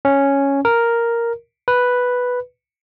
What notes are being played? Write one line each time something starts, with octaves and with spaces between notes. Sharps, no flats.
C#4
A#4
B4